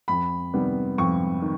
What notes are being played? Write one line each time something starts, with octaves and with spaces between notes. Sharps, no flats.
F2 B5
C3 D#3 G3 B3
F2 C#6
D#3